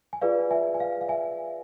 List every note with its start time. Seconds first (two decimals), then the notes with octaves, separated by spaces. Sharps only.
0.13 G#5
0.21 F4 G#4 B4 D5 F5
0.51 E5 G#5
0.74 G#5
0.80 F5
1.01 F5
1.08 E5 G#5